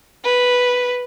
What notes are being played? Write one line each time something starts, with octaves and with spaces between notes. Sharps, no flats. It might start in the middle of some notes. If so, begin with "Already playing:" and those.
B4